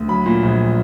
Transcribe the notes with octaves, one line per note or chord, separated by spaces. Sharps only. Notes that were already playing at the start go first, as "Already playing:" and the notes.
Already playing: D2
F#3 B5
A#2
A#1